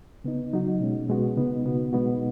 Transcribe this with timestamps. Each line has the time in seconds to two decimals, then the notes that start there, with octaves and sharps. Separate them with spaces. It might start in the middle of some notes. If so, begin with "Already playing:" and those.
0.24 C#3 B3 D#4
0.53 F#3 D#4 F#4
0.80 B2 G#3 C#4
1.09 B2 G#3 B3 F#4
1.37 C#3 B3 D#4
1.65 B2 B3 F#4
1.93 B2 G#3 B3 D#4 F#4